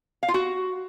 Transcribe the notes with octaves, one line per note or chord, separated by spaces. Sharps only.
F5
F4
F#4